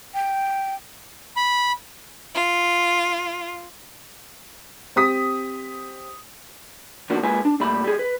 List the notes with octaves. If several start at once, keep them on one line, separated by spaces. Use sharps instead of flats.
G5
B5
F4
C4 G4 D#6 B6
D#3 F3 A#3 B3 D4 F#4
G#3 A#3 F4 B4 G#5
D4
A#2 G3 A3 B5
G3 G#4
B4